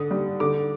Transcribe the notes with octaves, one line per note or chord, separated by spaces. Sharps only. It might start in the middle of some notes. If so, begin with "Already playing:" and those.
Already playing: D3 D#6
G3
D3 D6